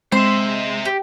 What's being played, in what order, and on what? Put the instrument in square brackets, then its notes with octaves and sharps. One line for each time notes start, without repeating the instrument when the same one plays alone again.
[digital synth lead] G#3 [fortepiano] C4 [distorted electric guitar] C5 E5 [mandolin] C6
[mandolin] G4